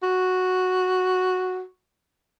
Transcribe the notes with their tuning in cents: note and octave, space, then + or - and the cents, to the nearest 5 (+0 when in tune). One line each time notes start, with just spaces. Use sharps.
F#4 -5